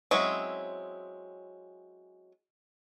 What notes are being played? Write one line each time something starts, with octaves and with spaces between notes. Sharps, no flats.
F#3 G#3 C4 C#4 E4